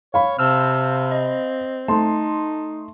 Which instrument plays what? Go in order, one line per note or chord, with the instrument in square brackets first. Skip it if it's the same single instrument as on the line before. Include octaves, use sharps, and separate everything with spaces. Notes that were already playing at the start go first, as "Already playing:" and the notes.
[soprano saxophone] C#5 [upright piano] F5 B5
[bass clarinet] C3 [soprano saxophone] C4 [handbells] A5 E6 F6
[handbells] D#5
[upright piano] A3 C6 [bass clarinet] D#4 [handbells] A5